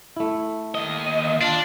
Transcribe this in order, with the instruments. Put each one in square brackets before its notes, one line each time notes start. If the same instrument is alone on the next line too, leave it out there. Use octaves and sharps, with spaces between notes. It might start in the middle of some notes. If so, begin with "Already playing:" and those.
[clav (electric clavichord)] A3 E4
[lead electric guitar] D#2 D#5
[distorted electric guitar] D4 [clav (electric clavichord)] F4 A5